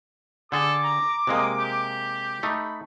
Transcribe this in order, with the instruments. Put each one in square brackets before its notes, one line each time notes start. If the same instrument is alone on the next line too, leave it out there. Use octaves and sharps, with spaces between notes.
[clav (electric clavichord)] D3 G#4 [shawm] A4 [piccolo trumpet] D6
[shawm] A#5
[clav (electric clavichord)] C3 G#3 A#3 [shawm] D#5
[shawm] G4
[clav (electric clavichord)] A3 D#4 [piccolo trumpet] B5